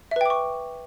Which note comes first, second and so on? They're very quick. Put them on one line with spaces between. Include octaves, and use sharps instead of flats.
E5 B4 G5 D6 C#6